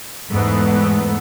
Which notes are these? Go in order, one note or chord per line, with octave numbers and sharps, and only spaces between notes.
E2 G#2 A3 B3